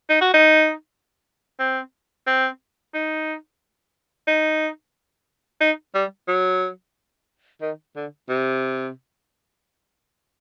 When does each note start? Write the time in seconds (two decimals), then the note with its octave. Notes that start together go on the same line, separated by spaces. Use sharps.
0.10 D#4
0.21 F#4
0.34 D#4
1.60 C4
2.27 C4
2.94 D#4
4.28 D#4
5.61 D#4
5.95 G3
6.28 F#3
7.62 D#3
7.96 D3
8.29 C3